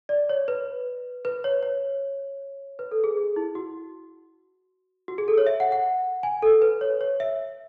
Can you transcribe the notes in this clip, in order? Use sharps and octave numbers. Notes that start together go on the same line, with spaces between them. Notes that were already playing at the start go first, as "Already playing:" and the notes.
D5
C#5
B4
B4
C#5
C#5
B4
A4
G#4
G#4
E4
F#4
F#4
G#4
A4
C#5
E5
F#5
F#5
G#5
A4
B4
C#5
C#5
E5